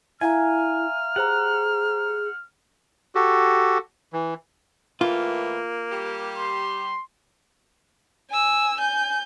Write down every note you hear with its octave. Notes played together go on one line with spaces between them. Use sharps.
E4 E5 F5 G#5 A#5 F6
G4 G#4 C5 F#5 A#5
F#4 G4 A4
E3
A2 E3 A#3 F4
G3 G4
C6
G#5 E6
G#5 G6